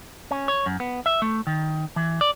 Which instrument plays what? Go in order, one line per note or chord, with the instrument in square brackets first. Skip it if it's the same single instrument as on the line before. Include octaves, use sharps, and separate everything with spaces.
[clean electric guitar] C#4
C#5
F#2
B3
E5
A3
D#3
E3
D5